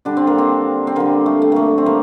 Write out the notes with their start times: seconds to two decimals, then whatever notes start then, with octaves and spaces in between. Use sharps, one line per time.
0.05 D3 G3 D4
0.17 C4
0.27 A#3
0.38 C4
0.87 C4
0.96 D3 G3 A#3
1.26 A3
1.42 A3
1.52 A3 A#3
1.78 C4
1.86 G3 A#3